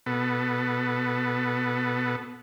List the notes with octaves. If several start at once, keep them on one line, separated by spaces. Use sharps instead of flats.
B2 B3 A4